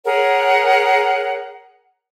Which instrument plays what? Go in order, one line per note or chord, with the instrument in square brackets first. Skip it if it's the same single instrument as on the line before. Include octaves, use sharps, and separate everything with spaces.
[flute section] G#4 A#4 C#5 F#5